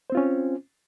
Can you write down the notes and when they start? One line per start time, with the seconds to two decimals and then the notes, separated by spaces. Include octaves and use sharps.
0.10 C5
0.12 C4
0.15 F4
0.17 C#4